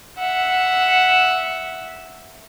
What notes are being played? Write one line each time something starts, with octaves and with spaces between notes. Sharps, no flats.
E5 F#5